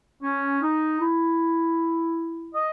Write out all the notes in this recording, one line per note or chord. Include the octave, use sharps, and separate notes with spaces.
C#4
D#4
E4
D#5